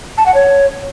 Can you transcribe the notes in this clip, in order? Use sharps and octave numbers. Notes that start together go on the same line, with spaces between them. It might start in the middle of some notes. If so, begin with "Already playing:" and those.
A5
F#5
C#5